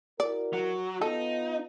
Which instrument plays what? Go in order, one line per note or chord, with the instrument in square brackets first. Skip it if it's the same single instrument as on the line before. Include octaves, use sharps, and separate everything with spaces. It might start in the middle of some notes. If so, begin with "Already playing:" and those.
[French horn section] E4 F#4 A#4 [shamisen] D5
[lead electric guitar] F#3
[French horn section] B3 F4 [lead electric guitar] D#4 [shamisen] A4